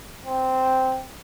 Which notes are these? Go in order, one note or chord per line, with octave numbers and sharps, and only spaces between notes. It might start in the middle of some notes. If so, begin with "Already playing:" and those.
C4